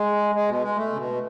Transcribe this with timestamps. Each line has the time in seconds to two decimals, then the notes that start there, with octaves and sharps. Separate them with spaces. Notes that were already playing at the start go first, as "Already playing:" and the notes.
Already playing: G#3
0.35 G#3
0.49 B2
0.63 G#3
0.76 A3
0.93 C#3
0.97 B2